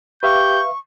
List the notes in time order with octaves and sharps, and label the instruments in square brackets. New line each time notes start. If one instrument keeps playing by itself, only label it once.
[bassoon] G4 [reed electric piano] B4 E5 F5 [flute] C#6 [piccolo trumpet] G6